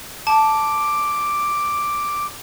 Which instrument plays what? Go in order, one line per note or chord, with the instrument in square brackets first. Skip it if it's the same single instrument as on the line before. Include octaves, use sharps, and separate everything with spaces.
[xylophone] A5 [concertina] D6